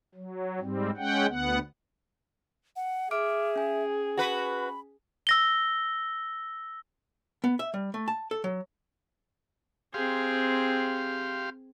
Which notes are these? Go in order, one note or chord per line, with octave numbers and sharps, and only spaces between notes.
F#3
G#2 G3 C4
G#3 C#4 F#5 G5
D2 B3 F#5
F#5
G#4 E5 D6 F6 D7
C#4 G#5
F#4 B4 B5
E6 A#6 G7
B3
E5
G3
A3
A5
A4
F#3
C4 G4 G#4 F5 C6